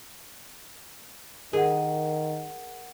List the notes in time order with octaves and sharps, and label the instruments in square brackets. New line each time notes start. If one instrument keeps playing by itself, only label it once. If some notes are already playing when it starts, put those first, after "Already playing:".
[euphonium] D#3 [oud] G#4 [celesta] A#4 F#5